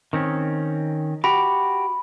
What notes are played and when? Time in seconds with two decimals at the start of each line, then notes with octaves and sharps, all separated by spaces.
0.13 D#3 C4 C#4
1.24 F#4 G4 B5